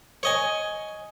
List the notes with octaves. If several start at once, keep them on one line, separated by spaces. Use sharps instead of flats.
C#5 D#5 G#5